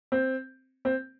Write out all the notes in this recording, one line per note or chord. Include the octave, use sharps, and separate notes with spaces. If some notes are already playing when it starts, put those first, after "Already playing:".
C4
C4